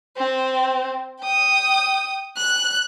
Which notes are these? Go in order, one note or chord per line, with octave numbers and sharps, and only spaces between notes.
C4
G5 D#6
F#6